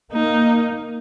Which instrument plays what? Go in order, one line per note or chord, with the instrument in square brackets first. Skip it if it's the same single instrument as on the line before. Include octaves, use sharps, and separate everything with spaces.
[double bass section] A#3 [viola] D#4